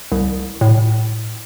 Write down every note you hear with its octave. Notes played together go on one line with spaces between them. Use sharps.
C2
A2